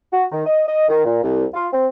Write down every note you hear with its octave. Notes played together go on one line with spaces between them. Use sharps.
F#4
D#3
D#5
D#5
D#3
A#2
C2
F4
C4